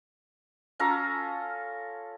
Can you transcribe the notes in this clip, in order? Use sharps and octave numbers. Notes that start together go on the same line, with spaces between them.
C#4 F4 A4 A#5